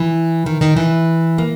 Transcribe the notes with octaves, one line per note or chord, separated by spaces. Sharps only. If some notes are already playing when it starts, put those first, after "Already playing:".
Already playing: E3
D#3
D#3
E3
A#3